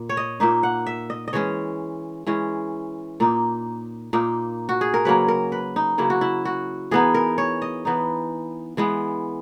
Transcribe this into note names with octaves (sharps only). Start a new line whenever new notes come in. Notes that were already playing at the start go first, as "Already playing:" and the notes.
Already playing: A#2
C#5
D#5
A#2 A#3 D#4 E5
F#5
E5
D#5
D#5
E3 G#3 C#4 C#5
E3 G#3 C#4
A#2 A#3 D#4
A#2 A#3 D#4
F#4
G#4
A#4
C#3 F#3 A#3 B4
A#4
B4
D#4
C#3 F#3 A#3 E4
F#4
E4
F#4
E3 B3 D#4 G#4
A#4
C#5
D#5
E3 B3 D#4
E3 G#3 B3